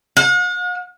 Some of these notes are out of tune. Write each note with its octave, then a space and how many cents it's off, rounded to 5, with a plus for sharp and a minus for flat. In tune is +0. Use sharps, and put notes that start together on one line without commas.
F#5 -45